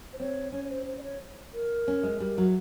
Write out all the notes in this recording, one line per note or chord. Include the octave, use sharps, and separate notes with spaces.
C5
C4 C#5
C#4 C#5
C#5
C5
C5
D5
C#5
A#4
C#4
G#3
G3
F#3